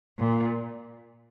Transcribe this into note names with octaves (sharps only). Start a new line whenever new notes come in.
A#2